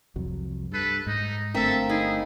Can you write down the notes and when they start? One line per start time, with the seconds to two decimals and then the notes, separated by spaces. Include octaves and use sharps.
0.16 C2 F2 F#3
0.71 G2 A4 B4
1.07 G#2 D#4
1.54 G1 A3 A#3 C4 D4 A4 E5
1.89 D#4 E4 G#4